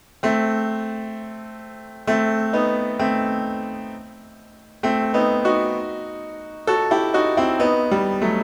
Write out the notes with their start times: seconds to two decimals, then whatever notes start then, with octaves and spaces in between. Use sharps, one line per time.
0.23 A3 C4
2.07 A3 C4
2.53 B3 D#4
2.99 A3 C4
4.83 A3 C4
5.14 B3 D#4
5.45 D#4 F#4
6.67 F#4 A4
6.91 E4 G4
7.14 D#4 F#4
7.37 C4 E4
7.60 B3 D#4
7.91 G3 B3
8.21 F#3 A3